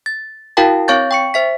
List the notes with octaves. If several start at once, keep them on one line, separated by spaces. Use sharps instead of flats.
A6
E4 F#4 A#4 F5 G5 A5
C4 C#5 F5 C#6 G6 A6
G5 C#6 C#7
C5 E5 B6